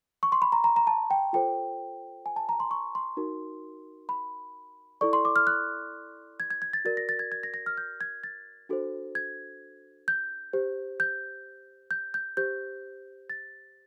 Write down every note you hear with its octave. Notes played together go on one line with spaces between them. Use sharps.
C#6
C6
B5
A#5
A#5
A#5
A5
G5
F4 A4 C5 G5
G#5
A5
A#5
C6
C#6
C6
D#4 F#4 A#4
B5
E4 A4 D5 C#6
C6
D6
F6
F#6
G#6
G#6
G#6
A6
F#4 A#4 D5 A6
A#6
A6
G#6
G#6
A#6
A#6
F6
G6
G#6
A6
D4 F#4 A4 C5
G#6
G6
G4 C5
G6
G6
G6
G4 C5 G6
A6